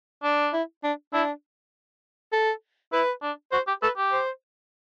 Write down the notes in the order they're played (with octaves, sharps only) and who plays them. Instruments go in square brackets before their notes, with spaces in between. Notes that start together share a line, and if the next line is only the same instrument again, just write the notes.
[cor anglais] D4
[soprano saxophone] E4
D4
[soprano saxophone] D4 [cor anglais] E4
[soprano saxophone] A4
[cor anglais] E4 [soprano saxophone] B4
[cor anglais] D4
[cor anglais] F#4 [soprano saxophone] C5
[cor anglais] G4
[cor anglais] A4 [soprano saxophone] B4
[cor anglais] G4
[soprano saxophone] C5